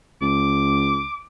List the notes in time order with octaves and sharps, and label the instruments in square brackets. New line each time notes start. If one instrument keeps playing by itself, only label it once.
[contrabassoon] C#2 [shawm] D6